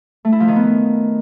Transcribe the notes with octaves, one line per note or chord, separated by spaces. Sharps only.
A3
E4
F3
D#3
B3